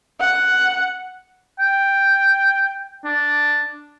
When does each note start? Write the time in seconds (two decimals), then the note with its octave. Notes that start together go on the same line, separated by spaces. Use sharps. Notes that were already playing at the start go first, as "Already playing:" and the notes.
0.20 F#5
1.59 G5
3.04 D4